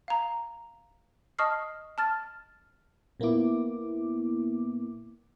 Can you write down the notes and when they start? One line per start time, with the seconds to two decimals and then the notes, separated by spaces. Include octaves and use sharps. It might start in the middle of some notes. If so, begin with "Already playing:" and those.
0.08 F5 A#5
1.39 D#5 A5 C#6 D#6 F6 C7
1.98 A5 F6 A6
3.20 A#2 A#3 B3 E4 D6